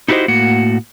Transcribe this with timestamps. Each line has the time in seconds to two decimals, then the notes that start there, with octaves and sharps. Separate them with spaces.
0.08 D#4 E4 F#4 G4 C5 D#5
0.28 A2 A#3 F#4 F#5